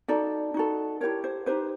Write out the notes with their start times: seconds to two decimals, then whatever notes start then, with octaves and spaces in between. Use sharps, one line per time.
0.08 D#4 F#4 A4 D5
0.54 D#4 F#4 A4
1.01 E4 G4 A#4 C#5
1.24 C5
1.46 D#4 G4 B4 C5